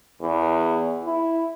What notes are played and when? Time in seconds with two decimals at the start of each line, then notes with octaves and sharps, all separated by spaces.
0.21 E2
1.05 E4